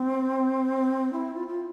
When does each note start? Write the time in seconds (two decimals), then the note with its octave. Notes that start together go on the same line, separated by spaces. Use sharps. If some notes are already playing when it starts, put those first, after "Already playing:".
Already playing: C4
1.13 E4
1.34 F4
1.47 F4